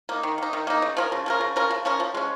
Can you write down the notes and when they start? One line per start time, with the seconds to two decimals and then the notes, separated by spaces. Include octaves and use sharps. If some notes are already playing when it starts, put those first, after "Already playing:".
0.09 A#3 D#4
0.23 D#3
0.38 A#3 D#4
0.53 D#3
0.67 A#3 D#4
0.82 C#3
0.97 F3 C#4 A#4
1.12 C#3
1.26 F3 C#4 A#4
1.41 C#3
1.56 F3 C#4 A#4
1.71 C#3
1.85 F3 C#4 A#4
2.00 F3
2.14 G#3 C#4